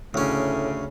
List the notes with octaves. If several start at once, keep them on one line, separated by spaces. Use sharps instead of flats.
D2 A2 C#3 C#4